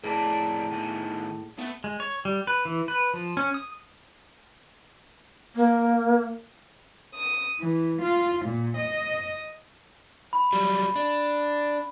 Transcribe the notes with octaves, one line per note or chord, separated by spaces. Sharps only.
F2 A2 G#4 A#4 D5 A5
D#3 B3 G#5
A3 B3
G#3
C#5
G3
B4
E3
B4
F3
C#4
D#6
A#3
D#6
E3
F4
A#2
D#5
B5
F#3 G3
D4